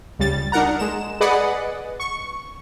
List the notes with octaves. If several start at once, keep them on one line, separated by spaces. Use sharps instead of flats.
C#2 G3 A6
D4 D#4 A#4 F#5 A#5
G#3 E7
G#4 B4 D5 D#5 F#5
C#6